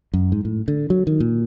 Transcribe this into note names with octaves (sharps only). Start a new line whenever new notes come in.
F#2
G#2
A2
D3
F#3
D#3
A#2